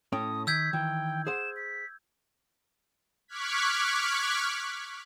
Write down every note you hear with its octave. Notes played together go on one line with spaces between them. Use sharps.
A2 C#4 G5 D#6
D#3 E6 G6 G#6 B6
D#3 E3 G5
G#4 C5 F#5 E7
B6
C#6 D6 F6 F#6 G#6 B6